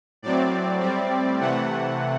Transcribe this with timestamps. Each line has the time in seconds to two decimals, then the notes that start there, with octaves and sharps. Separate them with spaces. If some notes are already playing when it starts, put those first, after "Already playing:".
0.22 A2 F#3 C4 D5
0.81 A2 G3 C4
1.40 C3 E3 A3 F#5